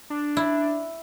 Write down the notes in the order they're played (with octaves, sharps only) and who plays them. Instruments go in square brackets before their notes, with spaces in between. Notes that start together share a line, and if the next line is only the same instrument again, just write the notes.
[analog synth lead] D4
[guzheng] E4